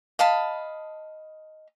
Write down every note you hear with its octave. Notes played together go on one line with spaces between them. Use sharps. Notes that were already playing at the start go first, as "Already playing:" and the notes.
D#5 F5 A5 B5